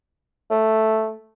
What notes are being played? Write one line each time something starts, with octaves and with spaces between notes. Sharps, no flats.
A3